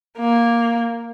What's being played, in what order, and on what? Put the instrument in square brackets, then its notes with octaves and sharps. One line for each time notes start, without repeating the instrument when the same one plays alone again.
[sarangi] A#3